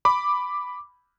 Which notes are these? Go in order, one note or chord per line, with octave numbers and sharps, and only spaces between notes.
B5 D6